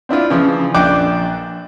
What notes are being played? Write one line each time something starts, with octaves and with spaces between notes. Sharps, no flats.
C4 D4 E4 F4
C#3 E3 F3
A#1 D4 G5 D6 F#6